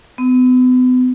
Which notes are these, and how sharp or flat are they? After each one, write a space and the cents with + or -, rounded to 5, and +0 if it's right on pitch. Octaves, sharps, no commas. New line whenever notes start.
B3 +40